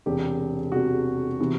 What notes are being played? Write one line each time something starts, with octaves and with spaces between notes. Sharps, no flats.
E1 E2 C3 G4
E1 E2 C3 F#4
C3 E3 B3